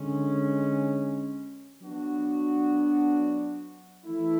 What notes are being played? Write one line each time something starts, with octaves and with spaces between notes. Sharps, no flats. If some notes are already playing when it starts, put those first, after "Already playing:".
Already playing: D3 G#3 C#4
F#3 B3 D4 F#4
E3 A3 E4